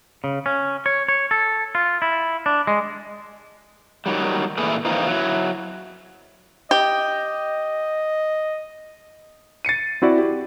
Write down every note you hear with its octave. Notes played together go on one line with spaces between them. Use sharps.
C#3
C#4
C#5
C#5
A4
F4
E4
D4
G#3
D#3 F#3 G3
A#2 E3 A3 E4 G#4
E3 F3 A#3 C4 D#4
F#3 E4
G4 D#5
A6 C7 C#7 D#7
C4 E4 F#4 D5
G4